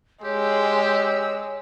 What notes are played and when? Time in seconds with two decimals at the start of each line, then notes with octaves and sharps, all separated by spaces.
0.24 G#3 G4 C#5 E6